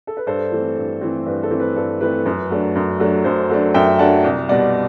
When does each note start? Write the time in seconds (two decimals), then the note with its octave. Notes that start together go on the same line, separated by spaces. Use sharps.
0.07 A4
0.17 B4
0.27 G2 A4 C5
0.52 E3 A3 C4
0.77 G2
1.01 E3 A3 C4
1.26 G2 B4
1.43 A4
1.51 E3 A3 C4
1.60 B4
1.76 G2 A4
2.01 E3 A3 C4 B4
2.25 F#2 B4
2.51 F#3 A3 D4
2.75 F#2
3.00 F#3 A3 D4
3.24 F#2 A4 C5
3.50 F#3 A3 D4
3.74 F#2 E5 G5
3.99 F#3 A3 D4 F#5 A5
4.24 C2
4.49 B2 G3 D5 F#5